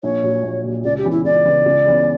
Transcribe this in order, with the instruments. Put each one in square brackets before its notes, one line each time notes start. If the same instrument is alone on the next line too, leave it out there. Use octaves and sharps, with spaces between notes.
[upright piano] A#1 [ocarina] C#5
[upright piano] A#2 F#3
A#1
A#2 F#3
[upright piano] C#2 [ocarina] D5
[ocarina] G4
[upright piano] C#3 E3 B3
[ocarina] E4
[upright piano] C#2 [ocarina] D5
[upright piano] C#3 E3 B3
C#2
C#3 E3 B3